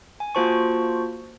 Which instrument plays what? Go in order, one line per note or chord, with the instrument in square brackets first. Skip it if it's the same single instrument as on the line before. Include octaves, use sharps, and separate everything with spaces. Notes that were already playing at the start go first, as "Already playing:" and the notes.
[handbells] G#5
A#3 F4 F#4 C5 A5 C#6